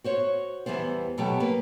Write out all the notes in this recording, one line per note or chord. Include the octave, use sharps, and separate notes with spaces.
F#4 C5 C#5
E2 E3 G3 B3 C5
B2 F#3 A3 G4
A#3 B4